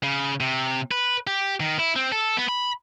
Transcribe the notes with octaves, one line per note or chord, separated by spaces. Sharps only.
C#3
C3
B4
G4
D#3
E4
C4
A4
B3
B5